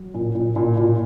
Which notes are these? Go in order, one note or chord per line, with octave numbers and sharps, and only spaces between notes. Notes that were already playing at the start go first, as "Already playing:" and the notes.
Already playing: F#3
A#2
A#2
A#2
A#2